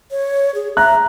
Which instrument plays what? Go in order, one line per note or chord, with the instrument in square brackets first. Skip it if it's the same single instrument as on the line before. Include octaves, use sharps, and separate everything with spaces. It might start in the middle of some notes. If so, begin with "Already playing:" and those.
[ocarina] C#5
G#4
[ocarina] E5 [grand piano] A#5 F#6